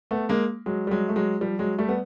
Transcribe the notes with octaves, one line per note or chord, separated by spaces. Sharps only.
A3 B3
G#3 A#3
F#3 G#3
G3
F#3 G#3
A3
F#3 G#3
F3 G3
F#3 G#3
G3 A3
B3